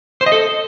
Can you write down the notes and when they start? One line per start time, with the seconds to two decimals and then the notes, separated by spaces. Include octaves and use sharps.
0.21 C5
0.26 D#5
0.32 A4